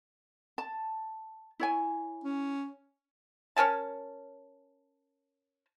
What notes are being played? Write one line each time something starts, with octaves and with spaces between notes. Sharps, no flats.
A5
E4 C#5 G#5
C#4
C#4 A#4 G#5 A5